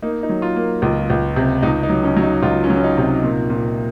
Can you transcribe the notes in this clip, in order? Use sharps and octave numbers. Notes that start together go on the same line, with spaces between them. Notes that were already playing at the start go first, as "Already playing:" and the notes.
A#3 D#4
D#4
F#3
F4
A#3
C#2 F4
C#2
C3
C#2 D#4
D#4
F#3
C#4
F#3
D#4
C#2 F4
C#4
F#3
C#4
D#4
C3
D#4
A#2
A#2